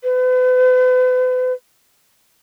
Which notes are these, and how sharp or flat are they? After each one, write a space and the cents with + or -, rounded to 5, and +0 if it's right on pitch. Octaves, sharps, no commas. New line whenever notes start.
B4 +40